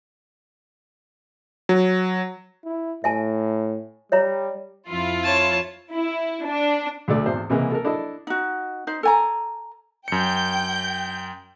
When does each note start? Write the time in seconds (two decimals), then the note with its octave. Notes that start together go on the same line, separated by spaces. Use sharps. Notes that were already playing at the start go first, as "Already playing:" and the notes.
1.69 F#3
2.65 E4
3.04 A2 E5 G#5 A5
4.12 G3 C#5 E5 A#5
4.88 F2 E4 F4
5.24 C#5 A5
5.92 E4
6.46 D4
7.08 D2 D3 A3 D5
7.26 G#1 E2 C5
7.50 C2 C#3 E3 G#3 A#3
7.71 A4 A#4
7.85 D4 E4 A4 D#5
8.27 D#4 F#4
8.87 D#4 C5
9.03 A4 G#5 A#5
10.08 F#2 G5 G6 C#7